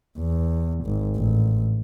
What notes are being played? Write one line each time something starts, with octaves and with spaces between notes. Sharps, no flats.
E2
G#1
A1